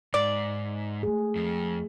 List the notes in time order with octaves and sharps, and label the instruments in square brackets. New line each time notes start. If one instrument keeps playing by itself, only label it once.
[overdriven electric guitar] G#2 [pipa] D5
[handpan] A3 G#4
[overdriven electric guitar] F2